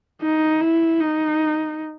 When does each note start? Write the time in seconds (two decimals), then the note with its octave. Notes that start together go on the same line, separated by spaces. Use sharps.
0.22 D#4
0.61 E4
1.00 D#4